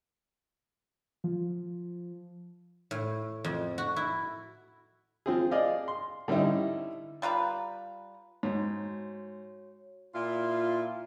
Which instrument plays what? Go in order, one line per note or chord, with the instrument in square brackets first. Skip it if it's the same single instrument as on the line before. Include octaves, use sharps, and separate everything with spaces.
[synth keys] F3
[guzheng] A2
F2
F#4
E4
[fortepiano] F3 C4 G#4
G#4 D5 D#5 F5
C6
D3 G3 C#4 D#4 E4
[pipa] G3 F4 B4 A#5
[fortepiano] G#2 [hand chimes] F#4 C#5
[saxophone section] A#2 E4 F4